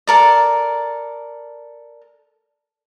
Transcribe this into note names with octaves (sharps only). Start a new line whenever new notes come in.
A4 A#4 D5